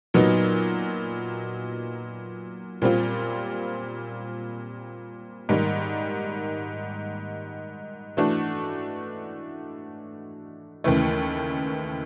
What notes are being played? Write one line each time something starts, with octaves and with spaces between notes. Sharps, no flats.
A#2 F#3 B3 D#4
A#2 G3 C4 F4
G#2 D#3 G3 A#3
E3 A3 D4 F#4
D#2 C#3 E3 A3